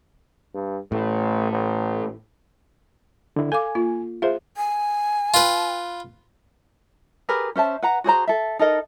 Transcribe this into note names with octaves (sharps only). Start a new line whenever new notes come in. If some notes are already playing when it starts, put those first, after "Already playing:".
G2
A1 A2
A1
D3 E4
A4 F5 G#5 D6
A#3 F4
F4 G#4 C5 E5
G#5
F4 B4
G4 G#4 A#4 B4
C#4 C5 E5 A5
B4 F#5 A#5
F#4 G#4 C5 A#5
A4 E5
D#4 A4 A#4 D#5